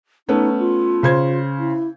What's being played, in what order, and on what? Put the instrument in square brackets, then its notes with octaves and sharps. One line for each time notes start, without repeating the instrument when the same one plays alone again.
[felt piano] A3 B3 C#4 [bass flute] D#4
[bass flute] F4
[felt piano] C#3 C5 G#6
[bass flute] E4